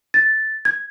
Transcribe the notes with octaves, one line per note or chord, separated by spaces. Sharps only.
A6
G#6